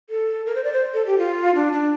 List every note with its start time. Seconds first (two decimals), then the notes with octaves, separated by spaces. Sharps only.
0.10 A4
0.46 A#4
0.55 C5
0.64 D5
0.73 C5
0.94 A4
1.06 G4
1.18 F4
1.55 D4
1.73 D4